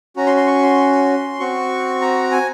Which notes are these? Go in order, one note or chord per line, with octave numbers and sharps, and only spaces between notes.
C#4 F#4 A#5
C6
C6
C#6
C6
C4 F#4 C#6
A#5
G#5